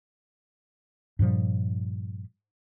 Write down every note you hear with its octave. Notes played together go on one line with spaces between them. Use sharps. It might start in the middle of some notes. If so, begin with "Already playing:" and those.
G2 A#2 F3 G3